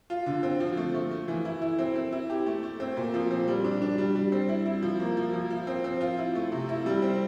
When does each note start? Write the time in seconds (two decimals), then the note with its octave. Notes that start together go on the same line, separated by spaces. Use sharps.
0.10 F4
0.26 D3
0.43 C4
0.60 F3
0.77 A3
0.94 A3
1.11 A3
1.28 E3
1.45 E4
1.62 E4
1.79 C4
1.96 C4
2.12 E4
2.30 G4
2.46 A3
2.63 A3
2.80 C4
2.97 A#2
3.14 F3
3.31 C4
3.48 G3
3.64 D4
3.82 D4
3.98 G3
4.15 G3
4.32 C4
4.49 E4
4.66 E4
4.83 F3
5.00 A#3
5.17 F3
5.33 F3
5.50 F3
5.67 C4
5.84 C4
6.01 F4
6.18 E4
6.35 A3
6.52 C3
6.69 E4
6.86 G3
7.02 C4